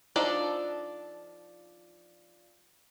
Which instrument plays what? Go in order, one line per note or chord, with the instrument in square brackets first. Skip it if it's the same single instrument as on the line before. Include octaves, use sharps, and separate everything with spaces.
[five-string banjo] F3 D4 D#4 A4 D5